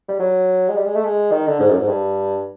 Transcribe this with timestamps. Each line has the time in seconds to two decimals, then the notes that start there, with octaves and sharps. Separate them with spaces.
0.08 G3
0.20 F#3
0.69 G#3
0.76 G3
0.85 G#3
0.95 A3
1.04 G#3
1.32 D#3
1.47 D3
1.60 G#2
1.70 F#2
1.79 G#2
1.88 G2